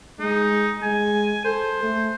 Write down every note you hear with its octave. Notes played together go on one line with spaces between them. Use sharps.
G#3 D#4
G#3 G#5
A4 C5
A3